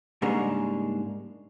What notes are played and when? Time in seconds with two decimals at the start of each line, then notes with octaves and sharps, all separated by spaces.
0.22 G#2 C#3 G3 G#3 A#3 D4